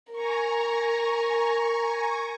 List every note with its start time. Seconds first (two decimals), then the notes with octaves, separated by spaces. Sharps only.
0.12 A#4 G#5 A#5 C#6